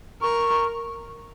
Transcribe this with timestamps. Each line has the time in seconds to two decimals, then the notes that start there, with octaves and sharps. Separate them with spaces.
0.22 A#4 C#6